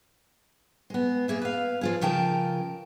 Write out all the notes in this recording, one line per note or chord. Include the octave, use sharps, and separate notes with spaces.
G#3 B3
A#3 G#4 E5
B4 F5
F3 F4 G#4
C#3 F3 A#4 G5 A5